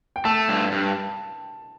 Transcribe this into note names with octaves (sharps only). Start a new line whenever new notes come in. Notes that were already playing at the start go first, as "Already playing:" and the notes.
G5
A3 A5
G2
G2